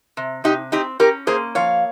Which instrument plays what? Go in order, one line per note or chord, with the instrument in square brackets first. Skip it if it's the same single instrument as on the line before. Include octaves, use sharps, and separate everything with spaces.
[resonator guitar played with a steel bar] C3
C3 D#4 G4
C4 D#4 G4
C#4 G4 A#4
A#3 G#4 C5
F3 C#5 F5